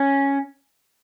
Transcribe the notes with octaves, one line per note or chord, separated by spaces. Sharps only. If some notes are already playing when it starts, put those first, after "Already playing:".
Already playing: C#4